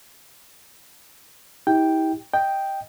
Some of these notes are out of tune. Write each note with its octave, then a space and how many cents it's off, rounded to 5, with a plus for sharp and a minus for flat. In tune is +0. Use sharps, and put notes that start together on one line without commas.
E4 -45 G4 +0 G5 +0
D#5 +0 G5 +0